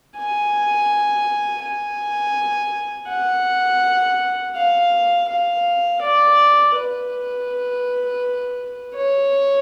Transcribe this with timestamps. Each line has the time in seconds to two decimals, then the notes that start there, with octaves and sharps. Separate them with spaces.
0.17 G#5
1.63 G#5
3.09 F#5
4.55 F5
5.29 F5
6.01 D5
6.75 B4
8.95 C#5